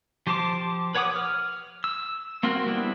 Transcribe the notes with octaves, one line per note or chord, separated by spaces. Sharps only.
F3 G4 C5 A5 D6
B4 C#5 F#5 D6 D#6
F6
E6
A#3 C4 F4 F#4 A#4
G3 B3 C4 D4 E4